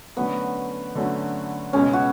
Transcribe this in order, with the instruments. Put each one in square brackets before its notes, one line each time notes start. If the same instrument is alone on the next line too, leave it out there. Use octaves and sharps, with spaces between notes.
[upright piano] D3 F#3 A3 C#4 F#4 [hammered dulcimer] B3
[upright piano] D3 F#3 A3 C#4 F#4
[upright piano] C#2 B2 G#3 [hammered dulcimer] C#4
[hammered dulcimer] F#4